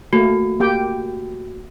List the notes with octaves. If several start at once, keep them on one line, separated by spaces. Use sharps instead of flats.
A3 A#3 F#4
A#3 G4 G5